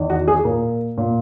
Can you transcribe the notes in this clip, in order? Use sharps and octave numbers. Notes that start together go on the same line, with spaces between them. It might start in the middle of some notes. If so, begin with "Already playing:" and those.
Already playing: E2 D#3
F#4
G#4
A#2 A#4
A#2